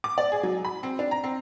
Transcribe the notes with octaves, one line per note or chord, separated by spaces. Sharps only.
D6
D5
G#4
F#3
B5
C4
D4
A#5
C4